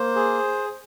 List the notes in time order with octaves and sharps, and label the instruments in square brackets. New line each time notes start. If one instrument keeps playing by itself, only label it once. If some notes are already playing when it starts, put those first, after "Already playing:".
Already playing: [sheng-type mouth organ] A#3 C5
G#4